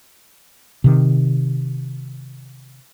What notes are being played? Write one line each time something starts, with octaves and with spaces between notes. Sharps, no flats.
C3 D#3